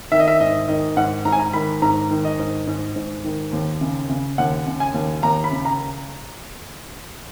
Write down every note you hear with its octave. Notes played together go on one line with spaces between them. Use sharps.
D#3 E5
D#5
E5
G#2 D#5
D#3 D#5
G#2 F#5
G#2 A#5
G#5
A#5
D#3 B5
G#2 A#5
D#3
D#5
G#2
G#2
G#2
D#3
D#2
C#3
C#3
D#2 F#5
C#3
G#5
D#2
D#2 A#5
B5
C#3
A#5